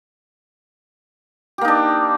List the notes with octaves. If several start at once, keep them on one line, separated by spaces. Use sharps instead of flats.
A#3 D4 D#4 G4